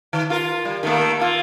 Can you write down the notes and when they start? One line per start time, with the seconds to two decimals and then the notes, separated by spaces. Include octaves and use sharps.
0.13 D#3
0.30 F4 A#4
0.65 G3
0.83 D#3 A3 A#3
1.20 A#3 F4